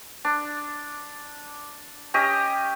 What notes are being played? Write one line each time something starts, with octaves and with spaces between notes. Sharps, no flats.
D4
C#4 G4 D#5